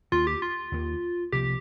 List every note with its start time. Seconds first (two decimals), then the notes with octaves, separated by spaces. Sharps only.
0.12 D#2 D#3 A#3 F4
0.27 G4
0.42 F4
0.72 D#2 D#3 A#3
1.33 C2 C3 F3 A#3 G4